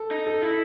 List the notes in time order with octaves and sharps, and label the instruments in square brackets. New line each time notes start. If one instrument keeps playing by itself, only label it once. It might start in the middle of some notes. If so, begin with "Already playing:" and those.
Already playing: [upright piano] A4
[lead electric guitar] D#4
[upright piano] A4
[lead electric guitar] E4